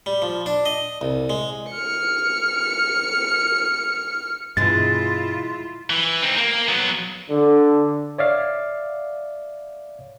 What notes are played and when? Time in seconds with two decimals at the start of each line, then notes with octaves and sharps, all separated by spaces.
0.06 G3
0.22 F3
0.46 D4
0.66 D#5
1.01 C2
1.30 G#3
1.72 F6 C#7
4.57 G2 B2 E3 G#3 E4 F4 A6
5.90 E3
6.22 C4 D#4
6.37 A#3
6.69 F#3 B3
7.29 D3
8.18 C#5 D5 E5 F5